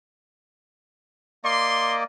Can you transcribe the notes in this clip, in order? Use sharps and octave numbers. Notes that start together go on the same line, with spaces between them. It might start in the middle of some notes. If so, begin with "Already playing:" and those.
A#3 D5 D#5 C6